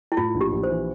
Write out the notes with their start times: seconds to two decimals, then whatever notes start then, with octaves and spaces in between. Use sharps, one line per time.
0.12 E4
0.17 A2 F4
0.35 A#1
0.41 G4
0.52 A#1
0.63 C5
0.69 E3